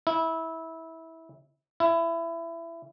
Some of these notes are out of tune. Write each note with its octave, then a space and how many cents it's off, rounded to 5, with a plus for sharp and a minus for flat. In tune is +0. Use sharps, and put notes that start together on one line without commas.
E4 -20
E4 +20